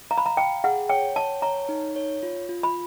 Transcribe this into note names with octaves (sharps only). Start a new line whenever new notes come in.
F5 A#5
B5
A#5
F5 G5
G#4 F#5
C#5 G5
C#5 A5
C#5 A#5
D#4
C#5
F4
F4
B5